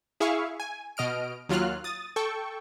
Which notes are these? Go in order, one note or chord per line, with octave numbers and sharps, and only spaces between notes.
E4 G#4 E5 F5 C#6
G#5
B2 D#5 F6 D7
D#2 F#3 F4 F6 F#6
D#6 A6
A4 G5 C#6